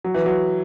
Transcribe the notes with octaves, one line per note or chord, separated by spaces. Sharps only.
F#3
E3
F#3